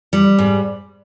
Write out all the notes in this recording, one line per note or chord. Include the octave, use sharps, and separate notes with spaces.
G3
G#2